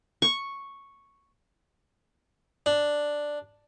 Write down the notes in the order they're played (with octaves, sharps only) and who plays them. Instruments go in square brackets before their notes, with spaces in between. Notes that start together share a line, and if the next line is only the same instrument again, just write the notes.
[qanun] C#6
[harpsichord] D4